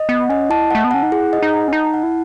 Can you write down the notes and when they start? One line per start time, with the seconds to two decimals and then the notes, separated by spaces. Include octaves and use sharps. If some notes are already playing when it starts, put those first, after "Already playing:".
Already playing: D#5
0.09 B3 F#5
0.29 C#4 D#5
0.50 E4 A5
0.71 A3 F#5
0.84 B3
0.91 C#4 F#5
1.03 D#4
1.11 E4 G#4
1.33 D#5
1.42 D#4
1.53 F#5
1.68 C#4
1.73 D#4 A5
1.94 F#5
2.03 E4